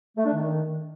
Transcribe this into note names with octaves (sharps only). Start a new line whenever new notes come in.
A3
D4
D#3